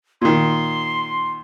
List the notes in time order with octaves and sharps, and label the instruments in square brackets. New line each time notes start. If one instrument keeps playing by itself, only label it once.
[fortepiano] A#2 D#3 [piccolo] C6